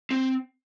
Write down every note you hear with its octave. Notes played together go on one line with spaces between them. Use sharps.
C4